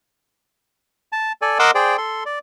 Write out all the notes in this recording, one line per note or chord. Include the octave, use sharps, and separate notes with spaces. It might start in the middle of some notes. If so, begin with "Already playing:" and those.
A5
A4 D5 G#5
A#4 D#5 F#5 C6 D6 E6
G#4 C5 D5 G5
A4 C6
D5